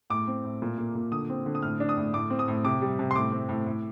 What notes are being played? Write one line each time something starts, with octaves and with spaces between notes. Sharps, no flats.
A2 D6
C4
A2
A#2
A#3
A#2
D3 D#6
C4
D3
D#6
A2 F6
D4
D#6
A2
A2 D6
C4
D#6
A2
C3 D6
G3
C3
C6
A2 D6
C4
A2
A2